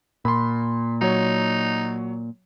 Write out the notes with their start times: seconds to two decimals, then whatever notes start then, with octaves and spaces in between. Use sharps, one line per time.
0.25 A#2 B5 C6
1.01 F#3 D#4 C#5